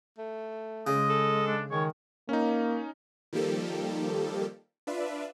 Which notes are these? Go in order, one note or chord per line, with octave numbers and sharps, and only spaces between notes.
A3
C#3 G#3 D#5
A4
D4
D#3 G#3 C#5
A#3 C#4 D#4
D#3 F3 G3 A#3 G4 A4
D4 F4 B4 D5 E5